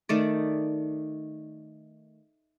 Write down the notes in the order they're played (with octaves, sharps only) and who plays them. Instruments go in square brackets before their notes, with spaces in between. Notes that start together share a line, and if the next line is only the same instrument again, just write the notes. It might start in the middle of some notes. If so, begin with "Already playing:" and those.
[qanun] D#3 A3 D5